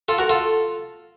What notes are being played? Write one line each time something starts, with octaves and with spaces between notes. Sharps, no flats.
F4 A4
F#4 A#4
F4 A4